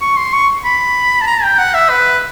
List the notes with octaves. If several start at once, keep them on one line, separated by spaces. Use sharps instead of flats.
C#6
C6
C#6
B5
A5
A#5
G5
F#5
E5
B4